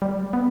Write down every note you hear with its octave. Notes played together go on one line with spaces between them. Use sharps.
G3
B3